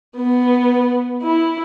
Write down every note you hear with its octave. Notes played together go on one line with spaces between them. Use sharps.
B3
E4